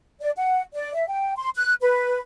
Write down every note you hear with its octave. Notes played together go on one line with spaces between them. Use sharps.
D5
F#5
D5
E5
G5
C6
F#6
B4